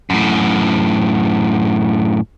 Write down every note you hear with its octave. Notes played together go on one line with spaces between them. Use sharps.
F#2 A2